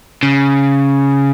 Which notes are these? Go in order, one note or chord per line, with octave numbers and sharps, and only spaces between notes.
C#3